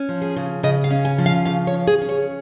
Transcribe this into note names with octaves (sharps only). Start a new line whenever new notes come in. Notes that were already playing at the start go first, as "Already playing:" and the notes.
Already playing: C#4
F3
G#4
C#3
C#3 D#5
F5
C#4
G#5
F3
F5
C#3 F5
C#5
C#3
G#4
C#4
C#5